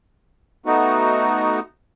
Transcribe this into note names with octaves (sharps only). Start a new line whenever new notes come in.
A3 B3 D#4 F#4